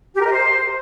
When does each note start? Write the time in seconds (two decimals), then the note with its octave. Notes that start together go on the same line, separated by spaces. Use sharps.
0.15 G4
0.20 A#4
0.26 D#5
0.31 C5